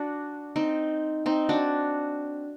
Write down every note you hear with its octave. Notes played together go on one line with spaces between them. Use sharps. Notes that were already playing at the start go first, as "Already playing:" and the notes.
Already playing: D4 F#4
C4 D#4
C4 D#4
D4 F#4